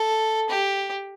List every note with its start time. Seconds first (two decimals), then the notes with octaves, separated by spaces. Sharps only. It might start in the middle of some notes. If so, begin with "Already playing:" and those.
Already playing: A4
0.49 G4